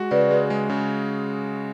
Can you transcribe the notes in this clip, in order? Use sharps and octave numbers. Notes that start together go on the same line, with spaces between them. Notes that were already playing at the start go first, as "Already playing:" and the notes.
Already playing: G#3 F#4
C#3 B4 D5
G#3
G#3
C#3